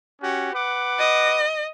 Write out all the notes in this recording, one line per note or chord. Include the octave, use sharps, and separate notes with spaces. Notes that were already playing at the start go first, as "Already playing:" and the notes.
C#4 F#4 G4
B4 F#5 D6
D#5